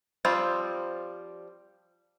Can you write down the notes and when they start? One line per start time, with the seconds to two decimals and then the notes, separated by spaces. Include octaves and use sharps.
0.25 F3 G3 C4 F4